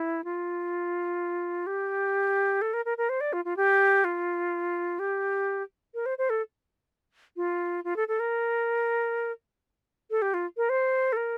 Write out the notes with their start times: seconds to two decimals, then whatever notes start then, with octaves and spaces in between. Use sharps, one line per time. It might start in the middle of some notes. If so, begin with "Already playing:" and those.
Already playing: E4
0.24 F4
1.66 G4
2.61 A4
2.73 A#4
2.85 A#4
2.98 A#4
3.09 C5
3.21 D5
3.33 F4
3.45 F4
3.57 G4
4.04 F4
4.99 G4
5.94 A#4
6.06 C5
6.18 C5
6.30 A4
7.36 F4
7.84 F4
7.96 A4
8.08 A4
8.20 A#4
10.11 A4
10.22 G4
10.34 F4
10.57 A#4
10.69 C5
11.12 A4
11.16 A#4